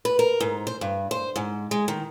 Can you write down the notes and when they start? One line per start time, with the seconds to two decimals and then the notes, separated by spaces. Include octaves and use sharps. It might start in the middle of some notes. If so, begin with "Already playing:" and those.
0.05 B4
0.19 A#4
0.40 G#2
0.67 C5
0.81 G2
1.11 C5
1.36 G#2
1.71 G#3
1.88 D#3